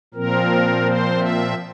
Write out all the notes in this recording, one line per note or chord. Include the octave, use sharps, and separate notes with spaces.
A#2 F3 C4 A#4
C5
E5